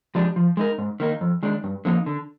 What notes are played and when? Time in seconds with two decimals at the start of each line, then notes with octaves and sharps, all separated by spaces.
0.15 F3 G#3 D4 G4
0.36 F3
0.57 G#3 D#4 A#4
0.78 G#2
1.00 D#3 A#3 D#4
1.21 F2
1.43 D#3 G#3 D4
1.64 G2
1.85 D3 F3 A#3 D#4
2.06 D3